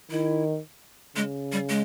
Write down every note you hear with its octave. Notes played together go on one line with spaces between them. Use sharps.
D#3 E4
C#3 G#3
G3
G#3